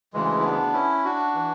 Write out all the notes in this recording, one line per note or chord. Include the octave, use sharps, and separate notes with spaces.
D2 C#3 E3 G#3
E4
B3 D4
C#4 E4
D4 F#4
E3